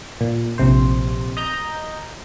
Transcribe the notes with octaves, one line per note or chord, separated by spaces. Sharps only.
A#2
A#1 C3 C5
D#5 A#5 G6